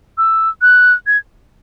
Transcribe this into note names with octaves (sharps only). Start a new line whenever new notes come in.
E6
F#6
G#6